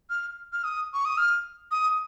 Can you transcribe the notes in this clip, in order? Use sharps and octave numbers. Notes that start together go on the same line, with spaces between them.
F6
F6
D#6
C#6
D#6
F6
D#6